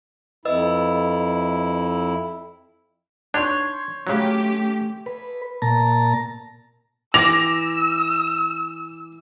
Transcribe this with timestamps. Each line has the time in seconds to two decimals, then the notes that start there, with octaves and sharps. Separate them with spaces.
0.45 F2 E4 B4 D#5 E6
3.34 D4 C#5 C6 G6
4.07 C#3 F#3 A3 C#4 G4
5.06 B4
5.62 A#2 A5 A#5
7.14 E3 D6 E6 A#6 F7